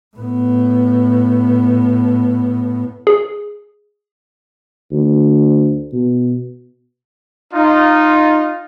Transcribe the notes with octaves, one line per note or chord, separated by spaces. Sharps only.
A2 B3
G#4
D2
B2
D#4 F4